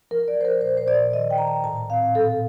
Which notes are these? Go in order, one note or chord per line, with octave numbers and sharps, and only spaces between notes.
F3 A#4
D5
F3 C5
A#4
A#2 C5
C5
A#2 D5
D#3 D#5
G5
D#3 A#5
A5
A2 A5
C4 F5
A#2 A4